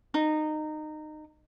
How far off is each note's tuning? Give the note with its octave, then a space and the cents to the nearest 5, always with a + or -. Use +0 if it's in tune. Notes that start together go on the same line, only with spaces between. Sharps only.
D#4 -20